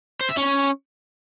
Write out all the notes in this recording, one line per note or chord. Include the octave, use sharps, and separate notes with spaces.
C5
E5
C#4